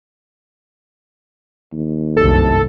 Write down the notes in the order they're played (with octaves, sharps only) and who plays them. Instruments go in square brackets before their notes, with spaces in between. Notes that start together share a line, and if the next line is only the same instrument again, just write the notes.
[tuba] D#2
[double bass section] G1 C2 F#2 [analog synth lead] A4